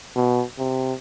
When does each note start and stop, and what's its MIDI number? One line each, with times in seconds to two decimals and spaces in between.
0.16 0.43 47
0.59 0.93 48